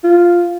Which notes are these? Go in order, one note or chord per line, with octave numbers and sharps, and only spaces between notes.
F4